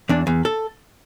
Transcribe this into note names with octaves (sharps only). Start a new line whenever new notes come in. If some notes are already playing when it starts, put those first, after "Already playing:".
E2 D4
E2
A4